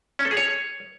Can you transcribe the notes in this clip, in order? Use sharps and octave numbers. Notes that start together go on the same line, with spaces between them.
C#4
A4
G#4
C#5